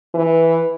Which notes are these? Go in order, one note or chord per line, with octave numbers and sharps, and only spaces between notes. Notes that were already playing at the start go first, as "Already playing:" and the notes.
E3